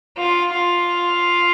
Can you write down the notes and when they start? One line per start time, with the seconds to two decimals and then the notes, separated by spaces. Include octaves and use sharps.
0.17 F4
0.52 F4